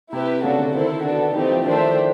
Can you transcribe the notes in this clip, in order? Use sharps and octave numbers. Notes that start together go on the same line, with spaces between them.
C3 E4 G4 B4
C#3 D4 F#4 A4
D3
D#3 E4 A4 C5
B3 D4 F#4 A4
E3 A3 C4 D#4 G4
F3
D#3 A3 D4 G4 C5 E5